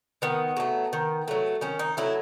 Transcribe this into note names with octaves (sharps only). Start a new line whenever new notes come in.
D#3 B3
F#3 A3
D#3
F#3 A3
D#3 C#4
D#4
F#3 A3 E4